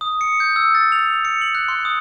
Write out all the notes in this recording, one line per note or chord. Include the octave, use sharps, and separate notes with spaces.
D#6
C#7
G6
E6
A6
F7
C#7
F#7
F#6
C6
D#6